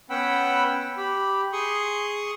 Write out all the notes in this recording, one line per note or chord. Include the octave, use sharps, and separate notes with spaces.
B3 C#4 F#5 G5 B5 E6
G4 B5
G#4 C6 C#6 D#6